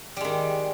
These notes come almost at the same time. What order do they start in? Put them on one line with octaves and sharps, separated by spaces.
G3 G#3 D#3